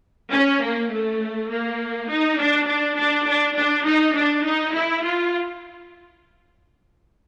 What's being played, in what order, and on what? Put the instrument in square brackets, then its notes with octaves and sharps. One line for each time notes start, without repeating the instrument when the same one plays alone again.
[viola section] C#4
A#3
A3
A#3
D#4
D4
D4
D4
D4
D4
D#4
D4
D#4
E4
F4